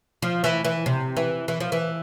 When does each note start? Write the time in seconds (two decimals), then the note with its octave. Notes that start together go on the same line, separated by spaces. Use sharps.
0.22 F3
0.44 E3
0.65 E3
0.86 C3
1.17 E3
1.48 E3
1.60 F3
1.72 E3